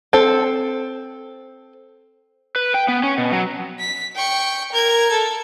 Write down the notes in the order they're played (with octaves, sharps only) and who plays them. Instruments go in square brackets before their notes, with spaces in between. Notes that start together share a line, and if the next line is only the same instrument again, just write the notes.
[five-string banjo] C4 A4
[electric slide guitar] B4
G5
B3
C#4
B2
F#3
[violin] B6
G5 C#6
A#4 G#6
A4